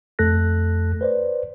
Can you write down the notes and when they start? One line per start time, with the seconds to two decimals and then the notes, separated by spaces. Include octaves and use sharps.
0.19 F2 A3 A4 F#6 A#6
1.01 B4 C5 D5